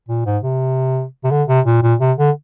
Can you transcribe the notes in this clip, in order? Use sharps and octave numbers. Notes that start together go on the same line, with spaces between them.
A#2
G#2
C3
C3
D3
C3
A#2
A#2
C3
D3